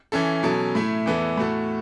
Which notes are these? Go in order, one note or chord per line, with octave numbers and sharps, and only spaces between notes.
E3 C#4 E4 A4
B2 F#3 C#4 A4
A2 A3 E4
E2 E3 B3 E4 A4
A2 A3 F#4 A4